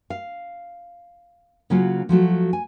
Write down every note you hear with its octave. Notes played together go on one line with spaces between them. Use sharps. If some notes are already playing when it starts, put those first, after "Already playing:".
F5
C#3 F#3 A#3 C#4 F4 F#4
F3 F#3 A3 F#4
G#5